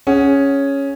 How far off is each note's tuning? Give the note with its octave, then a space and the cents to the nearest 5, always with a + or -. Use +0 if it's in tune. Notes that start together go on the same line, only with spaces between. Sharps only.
C#4 +0 G#4 +0 F#5 +0